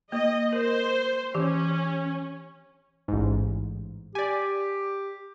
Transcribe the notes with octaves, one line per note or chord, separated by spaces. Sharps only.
A#3 D#5
A#4 C5
E3 C#4 G4
A1 G#2
G4 D5 G#5